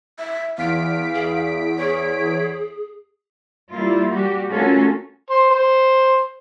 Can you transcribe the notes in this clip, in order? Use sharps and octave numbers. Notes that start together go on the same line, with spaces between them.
E5
E2 F5 B6 D7
G#4
G#4 C#5
G3 A#3 E4 F4
G3 F#4 G4
A3 C#4 F4 F#4 A4 A#4
C5
C5